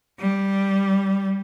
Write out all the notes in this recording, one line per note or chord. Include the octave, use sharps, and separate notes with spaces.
G3